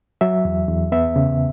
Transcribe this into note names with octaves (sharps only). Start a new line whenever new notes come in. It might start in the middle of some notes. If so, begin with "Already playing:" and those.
F#3 E5
E2
E2
B3 E5
C#3